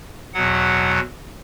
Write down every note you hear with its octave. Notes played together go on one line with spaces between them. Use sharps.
E2 B2 F#3 F#5